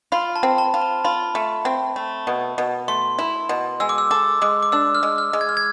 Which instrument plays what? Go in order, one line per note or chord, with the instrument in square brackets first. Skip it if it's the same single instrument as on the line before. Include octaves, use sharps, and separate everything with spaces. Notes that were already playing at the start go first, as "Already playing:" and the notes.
[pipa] F4 [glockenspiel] B5
[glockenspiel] A5
[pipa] C4
[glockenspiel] A5
[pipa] F4
[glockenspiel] A5
[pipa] F4 [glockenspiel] B5
[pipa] A3
C4
A3
B2
B2
[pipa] A3 [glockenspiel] C6
[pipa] E4
B2
[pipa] G#3 [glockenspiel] E6
[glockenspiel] D6
E6
[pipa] A4 [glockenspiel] D6
[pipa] G#3 [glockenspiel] D6
[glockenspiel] D6
[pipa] D4 [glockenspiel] E6
[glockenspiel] F6
[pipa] G#3
[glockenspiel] F6
[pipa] G#3
[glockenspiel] G#6
F6
G#6